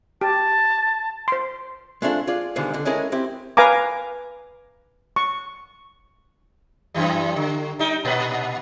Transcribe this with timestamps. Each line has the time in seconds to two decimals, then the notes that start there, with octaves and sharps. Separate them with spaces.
0.21 G4 A5
1.28 C5 C6
2.02 G#3 A3 C4 D4 F4
2.27 F4 G#4 D5
2.56 B2 D3 D#3 F3 G3 G#3
2.73 B1 D3
2.85 G#3 A3 C#4 E4 G#4 A#4
3.12 C4 E4 G4
3.57 B4 F5 G#5 A#5 D6
5.16 C#6
6.94 F#2 E3 G3
7.36 D3
7.79 G3 D#4
8.05 A#2 B4